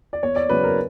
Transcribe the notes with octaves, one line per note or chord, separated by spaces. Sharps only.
D5
E2 C#5
D5
C#3 F#3 B3 B4
A#4